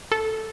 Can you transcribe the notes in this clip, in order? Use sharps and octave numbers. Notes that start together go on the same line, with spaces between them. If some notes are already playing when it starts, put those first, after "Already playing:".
A4